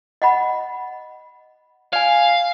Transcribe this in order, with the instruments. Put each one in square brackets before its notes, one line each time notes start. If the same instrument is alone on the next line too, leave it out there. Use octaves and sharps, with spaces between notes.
[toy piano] D#5 F#5 B5
[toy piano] D5 G#5 [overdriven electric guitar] F5